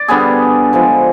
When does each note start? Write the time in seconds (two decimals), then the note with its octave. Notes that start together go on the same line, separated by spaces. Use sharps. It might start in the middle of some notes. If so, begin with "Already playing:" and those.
Already playing: D5
0.08 D3 G3 B3 G#4
0.73 D3 F3 G#3